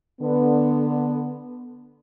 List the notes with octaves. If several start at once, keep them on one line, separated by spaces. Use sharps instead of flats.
D3 B3